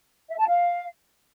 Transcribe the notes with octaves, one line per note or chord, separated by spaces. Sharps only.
E5
A5
F5